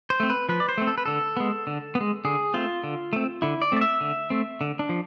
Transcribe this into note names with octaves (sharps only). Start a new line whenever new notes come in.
C5
A3 C4
B4
F3 B4
D5
C5
A3 C4
A4
B4
D3 A4
G#3 B3
D3
B3
G#3
D3 G#4
A3 C4 F4
D3
A3 C4
D3 E4
D5
A3 C4 D5
E5
D3
A3 C4
D3
D4
F3